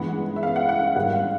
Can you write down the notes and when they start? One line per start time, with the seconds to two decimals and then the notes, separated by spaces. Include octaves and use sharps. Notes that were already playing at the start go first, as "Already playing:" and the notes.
Already playing: G2 E3 G#3 B3 F#5
0.36 E5
0.43 F5
0.56 F#5
0.69 F#5
0.82 F5
0.95 G#2 D#3 G3 F#5
1.13 F5